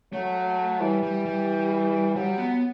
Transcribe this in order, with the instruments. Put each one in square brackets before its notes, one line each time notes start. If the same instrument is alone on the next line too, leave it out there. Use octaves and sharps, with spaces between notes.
[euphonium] F#3 [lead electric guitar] A3
[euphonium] E3 [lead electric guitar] G3
[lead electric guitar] G3
G3
[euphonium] F#3 [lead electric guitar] G3
[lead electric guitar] B3